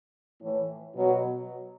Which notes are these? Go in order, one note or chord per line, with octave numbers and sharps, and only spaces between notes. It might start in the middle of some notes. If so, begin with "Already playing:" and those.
A2 E3
B2 F#3